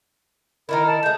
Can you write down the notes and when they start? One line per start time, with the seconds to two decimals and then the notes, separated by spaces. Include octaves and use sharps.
0.69 D#3 D#4 E4 A#4
0.86 A5
1.03 G#3 A3 G6